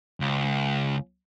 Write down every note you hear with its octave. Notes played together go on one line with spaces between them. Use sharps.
C#2